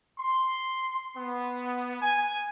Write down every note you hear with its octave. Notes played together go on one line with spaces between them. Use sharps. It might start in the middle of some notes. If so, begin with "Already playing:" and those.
C6
B3
G#5